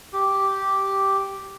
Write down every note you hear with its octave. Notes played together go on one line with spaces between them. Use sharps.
G4